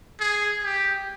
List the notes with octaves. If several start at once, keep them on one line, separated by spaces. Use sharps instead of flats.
G#4
G4